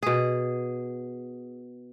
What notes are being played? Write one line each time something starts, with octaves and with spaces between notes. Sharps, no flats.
B2 G#4